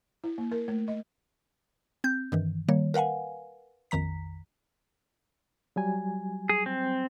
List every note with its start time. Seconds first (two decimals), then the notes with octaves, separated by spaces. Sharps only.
0.24 E4
0.38 A#3
0.51 A#4
0.68 A3
0.88 D#5
2.04 C4 G6
2.32 G2 D#3 E3
2.69 D#3 G3 A#3 C#5
2.94 A#4 B4 F5 F#5 G#5
3.91 A#1 F2 D#3 A#5 B6
5.76 F#3 G3 G#5
6.49 G#4
6.66 C4